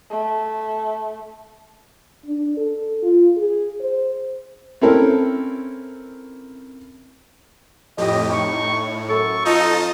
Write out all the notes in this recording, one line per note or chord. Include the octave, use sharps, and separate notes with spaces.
A3
D4
A4
F4
G#4
C5
C4 C#4 E4 A4 A#4
F2 A2 G4 D#5
A2 D#4 C#6
F#2 A4 C#6
F2 D#4 F4 D#5 A5